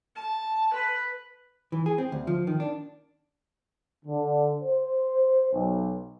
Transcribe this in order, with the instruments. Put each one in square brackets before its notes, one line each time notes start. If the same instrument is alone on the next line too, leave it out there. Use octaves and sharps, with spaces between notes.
[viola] A5
B4
[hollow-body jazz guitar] E3
G#4
C4
D2
F3
D#3
D4
[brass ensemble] D3
C5
B1